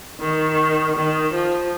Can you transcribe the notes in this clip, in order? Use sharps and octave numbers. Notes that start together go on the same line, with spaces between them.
D#3
D#3
F3